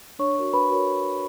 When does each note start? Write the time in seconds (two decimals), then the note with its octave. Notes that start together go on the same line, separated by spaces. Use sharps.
0.19 D4 C#5 C#6
0.36 F#4 A#4 C#5
0.53 D4 B4 B5
0.70 F#4 A#4 C#5